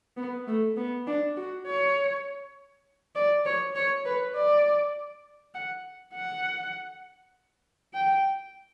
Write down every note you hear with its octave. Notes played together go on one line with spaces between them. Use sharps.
B3
A3
B3
D4
F#4
C#5
D5
C#5
C#5
B4
D5
F#5
F#5
G5